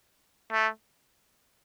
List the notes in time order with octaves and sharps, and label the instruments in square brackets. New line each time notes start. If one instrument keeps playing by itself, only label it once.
[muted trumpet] A3